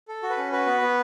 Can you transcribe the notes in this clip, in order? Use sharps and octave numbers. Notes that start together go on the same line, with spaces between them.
A4
F#4
B4
C#4
F#4 B4
B3
B3